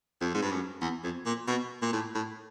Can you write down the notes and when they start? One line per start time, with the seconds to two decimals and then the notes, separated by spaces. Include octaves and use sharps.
0.21 F2
0.34 G#2
0.42 G2
0.51 F#2
0.81 E2
1.04 F2
1.26 A#2
1.48 B2
1.82 A#2
1.93 A2
2.15 A2